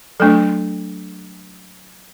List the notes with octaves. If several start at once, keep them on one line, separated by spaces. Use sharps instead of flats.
F#3 A3 D4 A4